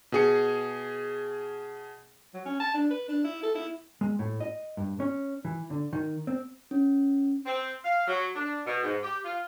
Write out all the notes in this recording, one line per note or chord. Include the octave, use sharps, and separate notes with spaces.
B2 G#4 C#7
F#3
C#4
A5
D4
B4
D4
E4
A4
E4
G#3
A2
D#5
G2
C#4
E3
D3
D#3
C4
C#4
C4
F5
F#3
D4
B2
G#2
G4
F4